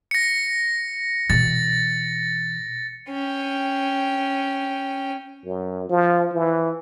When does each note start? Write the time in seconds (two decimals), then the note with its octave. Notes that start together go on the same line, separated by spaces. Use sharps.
0.11 A#6 C#7
1.30 B2 E3 A6
3.09 C#4 G5
5.45 F#2
5.89 F3
6.33 E3